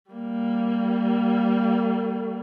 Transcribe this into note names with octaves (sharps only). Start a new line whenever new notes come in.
G3 A#3